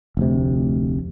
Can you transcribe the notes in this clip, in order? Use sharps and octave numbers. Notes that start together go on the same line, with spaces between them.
F1 D2 C3